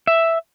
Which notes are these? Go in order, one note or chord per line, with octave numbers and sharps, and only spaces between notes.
E5